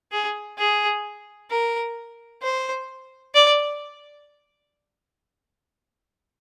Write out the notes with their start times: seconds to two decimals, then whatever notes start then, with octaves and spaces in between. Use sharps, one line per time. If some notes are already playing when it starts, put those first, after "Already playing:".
0.12 G#4
0.58 G#4
1.51 A#4
2.42 C5
3.34 D5